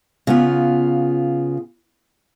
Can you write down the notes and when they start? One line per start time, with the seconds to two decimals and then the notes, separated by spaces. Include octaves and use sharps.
0.27 C#3 B3 F4